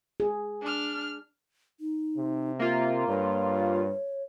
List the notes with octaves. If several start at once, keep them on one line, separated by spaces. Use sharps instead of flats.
G#4
D4 F6
D#4
C3
A#3 F4 E5
G2 C#5